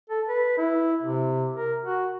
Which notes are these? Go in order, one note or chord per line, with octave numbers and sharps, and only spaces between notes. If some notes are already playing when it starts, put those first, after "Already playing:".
A4
B4
E4
C3
A#4
F#4